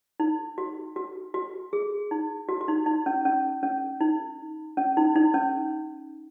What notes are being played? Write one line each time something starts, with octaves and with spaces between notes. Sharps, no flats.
D#4
F#4
F#4
F#4
G#4
D#4
F#4
F#4
D#4
D#4
C#4
C#4
C#4
D#4
C#4
D#4
D#4
C#4